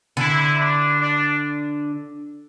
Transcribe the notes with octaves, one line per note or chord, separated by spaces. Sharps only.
D3 E4
D4
D4